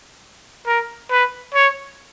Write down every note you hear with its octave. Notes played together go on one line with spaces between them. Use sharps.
A#4
B4
C#5